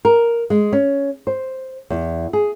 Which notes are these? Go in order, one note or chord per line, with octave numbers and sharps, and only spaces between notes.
A#4
G#3
C#4
C5
E2
G#4